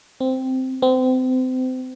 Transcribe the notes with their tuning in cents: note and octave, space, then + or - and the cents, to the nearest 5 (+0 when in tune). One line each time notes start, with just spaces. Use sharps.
C4 -5
C4 -30